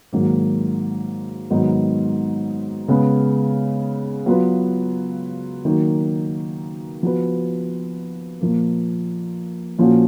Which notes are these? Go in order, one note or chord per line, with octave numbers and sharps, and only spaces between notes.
G#2 D#3 F#3 A#3
G#2 D#3 F#3 B3 D#4
C#3 G#3 B3
F#3 B3 F4 B4
D#3 F#3 A#3 D#4
F3 B3 F#4 B4
A#2 F3 A#3
A#2 F3 A#3 C#4 F#4